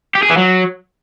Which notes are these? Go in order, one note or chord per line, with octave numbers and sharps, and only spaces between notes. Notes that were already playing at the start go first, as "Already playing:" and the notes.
G4
G#4
E3
F#3